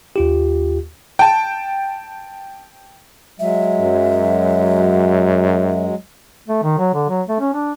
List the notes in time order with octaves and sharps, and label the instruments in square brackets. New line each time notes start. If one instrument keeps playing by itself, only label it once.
[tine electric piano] D#2 F4 G4
[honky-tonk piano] G5 A5
[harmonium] F#3 G#3 [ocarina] E5
[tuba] F#2
[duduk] A3
D#3
F#3
D3
F#3
A3
C#4
D4